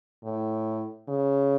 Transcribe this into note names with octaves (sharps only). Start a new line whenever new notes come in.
A2
C#3